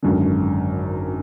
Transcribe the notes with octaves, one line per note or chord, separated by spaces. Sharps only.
G#1 F#2 D3